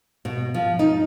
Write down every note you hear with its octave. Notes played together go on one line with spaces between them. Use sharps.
B2
F3
D#4